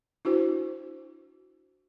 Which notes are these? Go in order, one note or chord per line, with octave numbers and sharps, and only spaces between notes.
D4 E4 F#4 C5